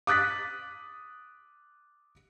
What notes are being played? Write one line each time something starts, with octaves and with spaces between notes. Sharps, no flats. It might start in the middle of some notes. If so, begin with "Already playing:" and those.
D6 D#6 F#6 A6 B6